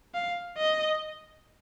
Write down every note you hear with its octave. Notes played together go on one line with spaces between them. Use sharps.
F5
D#5